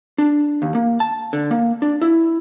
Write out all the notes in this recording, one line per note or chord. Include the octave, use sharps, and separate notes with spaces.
D4
D#2
A#3
A5
D3
A#3
D4
E4